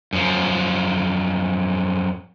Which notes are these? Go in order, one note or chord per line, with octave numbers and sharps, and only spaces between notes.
F#2 F3